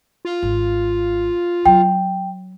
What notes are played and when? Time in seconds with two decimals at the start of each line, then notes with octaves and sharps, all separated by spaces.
0.25 F4
0.43 G#1
1.66 F#3 E4 G5